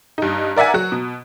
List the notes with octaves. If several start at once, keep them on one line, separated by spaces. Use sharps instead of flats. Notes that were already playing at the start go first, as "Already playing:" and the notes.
G2 D#4
A#4 D5 E5 F#5 G#5
F#3 F#4
B2